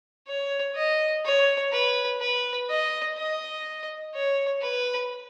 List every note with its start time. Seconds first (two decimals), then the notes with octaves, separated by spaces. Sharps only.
0.27 C#5
0.76 D#5
1.25 C#5
1.72 B4
2.21 B4
2.70 D#5
3.18 D#5
4.14 C#5
4.62 B4